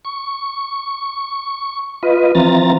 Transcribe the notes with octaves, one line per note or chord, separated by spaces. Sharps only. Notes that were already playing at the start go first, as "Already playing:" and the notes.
C#6
F4 B4 D#5
E3 F3 C4 A#5 A6